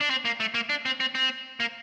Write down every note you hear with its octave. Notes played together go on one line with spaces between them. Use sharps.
D4
C4
A#3
A3
A#3
D4
C4
C4
C4
A#3